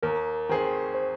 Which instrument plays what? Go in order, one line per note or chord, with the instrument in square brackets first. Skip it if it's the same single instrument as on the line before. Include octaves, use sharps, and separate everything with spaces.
[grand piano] D#2 [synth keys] A#4
[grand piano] D#3 C4 G#4 C5
[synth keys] C5